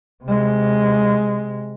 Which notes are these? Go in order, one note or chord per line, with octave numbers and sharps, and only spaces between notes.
C3 G#3